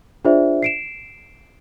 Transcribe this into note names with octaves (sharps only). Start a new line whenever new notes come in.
D4 F4 G#4 C5 D5 E5
C7 D7 E7